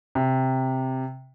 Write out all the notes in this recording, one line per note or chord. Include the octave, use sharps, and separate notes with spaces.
C3